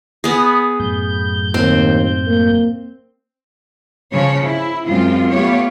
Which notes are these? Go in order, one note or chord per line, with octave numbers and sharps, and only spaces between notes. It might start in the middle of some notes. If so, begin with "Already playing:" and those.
B3 G#4
F#2 A2 G6
D#2 C4
A#3
C#3 F3 C#5
E4
F#2 G#3 C4 F4
A3 B3 F4 G4 C#5